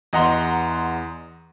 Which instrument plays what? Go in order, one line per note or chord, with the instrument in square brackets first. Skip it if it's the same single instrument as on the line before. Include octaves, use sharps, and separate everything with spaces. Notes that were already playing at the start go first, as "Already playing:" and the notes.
[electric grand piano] E2 D#5 F#5 A#5 C6